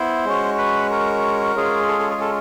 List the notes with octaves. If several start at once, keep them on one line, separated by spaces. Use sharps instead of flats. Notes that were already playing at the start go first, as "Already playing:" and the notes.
Already playing: B3 E4 C5
G#3 C#4 F#4
B4
A#4
G#3 C#4 F4 G#4
A4
A4
G#4
A4